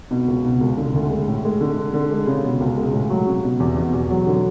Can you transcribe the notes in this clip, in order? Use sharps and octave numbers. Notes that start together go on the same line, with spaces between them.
B2
C#2
B2
C#2
D3
D2
G#3
A2
G#3
D3
G#3
D3
G#3
C#3
B2
C#2
G#3
A2
F#3
C#3
B2
E2
B2
E2
F#3
D3